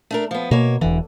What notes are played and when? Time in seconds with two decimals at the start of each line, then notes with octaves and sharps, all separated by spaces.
0.11 A3 D4 A#4
0.31 F3 B3
0.51 B2 A#3 C#5
0.81 E1 D3 E3